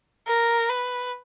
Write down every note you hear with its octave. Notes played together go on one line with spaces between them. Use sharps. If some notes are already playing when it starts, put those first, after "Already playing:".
A#4
B4